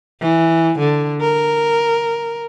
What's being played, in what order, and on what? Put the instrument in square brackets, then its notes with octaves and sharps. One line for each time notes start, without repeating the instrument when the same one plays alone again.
[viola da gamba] E3
D3
A#4